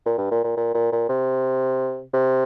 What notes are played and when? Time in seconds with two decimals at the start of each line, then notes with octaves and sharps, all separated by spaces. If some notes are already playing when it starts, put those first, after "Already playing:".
0.06 A#2
0.18 G2
0.31 A#2
0.44 A#2
0.57 A#2
0.74 A#2
0.92 A#2
1.09 C3
2.14 C3